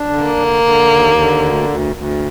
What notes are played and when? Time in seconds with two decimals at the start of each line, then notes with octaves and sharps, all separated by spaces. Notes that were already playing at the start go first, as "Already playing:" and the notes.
Already playing: D4
0.09 D3
0.23 A#3
0.37 D3
0.63 D3
0.90 D#2
1.16 D3
1.43 D2
1.69 D2
1.96 D2